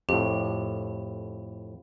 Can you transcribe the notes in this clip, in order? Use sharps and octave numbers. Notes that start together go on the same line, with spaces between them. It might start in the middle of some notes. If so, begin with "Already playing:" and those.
F2 A2 G4